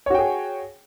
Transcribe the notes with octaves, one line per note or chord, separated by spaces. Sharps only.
F#4 G#4 C#5 G5